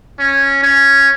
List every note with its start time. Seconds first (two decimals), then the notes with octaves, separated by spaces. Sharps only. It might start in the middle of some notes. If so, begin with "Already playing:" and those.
0.19 C#4
0.63 C#4